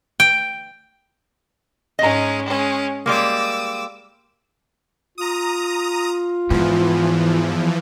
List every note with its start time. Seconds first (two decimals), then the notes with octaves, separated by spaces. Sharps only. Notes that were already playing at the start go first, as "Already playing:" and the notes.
0.20 G5
1.99 G#2 G#3 C#4 D#5 A#5
2.44 G#3 C#4
3.06 G3 G#3 A#3 D6 E6
5.18 F4 A#5 D#6
6.50 E2 G#2 E3 F3